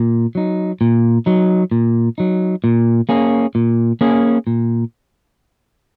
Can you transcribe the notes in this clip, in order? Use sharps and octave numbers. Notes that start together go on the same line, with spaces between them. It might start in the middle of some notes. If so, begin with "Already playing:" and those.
Already playing: A#2
F#3 D#4
A#2
F#3 D#4
A#2
F#3 D#4
A#2
A#3 C#4 G#4
A#2
A#3 C#4 G#4
A#2